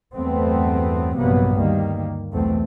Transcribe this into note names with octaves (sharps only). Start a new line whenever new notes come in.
E2 G2 F#3 A3 B3 C4
A#1 G2 C3 F#3 A#3 B3
D2 D#3 G3 A#3
B1 E2 A3 C4